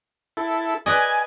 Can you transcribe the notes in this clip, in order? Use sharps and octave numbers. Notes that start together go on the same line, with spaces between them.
E4 A4
B4 D5 D#5 G#5